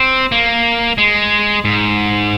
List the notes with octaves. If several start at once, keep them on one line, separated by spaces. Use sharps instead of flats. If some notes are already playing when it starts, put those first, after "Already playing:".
Already playing: C4
A#3
G#3
G#2